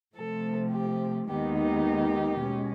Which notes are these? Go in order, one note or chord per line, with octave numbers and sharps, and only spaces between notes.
C3 F3 A3 A4
G4
D#2 D#3 G#3 B3 D#4 G4
G4
B2 G#3 C#4